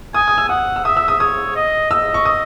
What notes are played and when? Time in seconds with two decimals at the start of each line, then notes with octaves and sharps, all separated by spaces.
0.14 G#5 D#6
0.28 D#6
0.38 E6
0.49 F#5 D#6
0.76 E6
0.85 E5 D#6
0.97 E6
1.08 D#6
1.19 C#5 D#6
1.55 D#5
1.91 D#5 E6
2.14 C#6
2.25 D#6